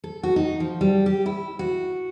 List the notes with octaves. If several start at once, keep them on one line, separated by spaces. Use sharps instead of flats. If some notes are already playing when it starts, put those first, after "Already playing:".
A4
F#4
D#4
F3
G3
G4
E4
F#4